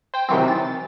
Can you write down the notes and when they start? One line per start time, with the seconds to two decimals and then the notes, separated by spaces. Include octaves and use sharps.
0.14 C5 G5
0.29 C3 D#3 E3 F#3 C4
0.48 A6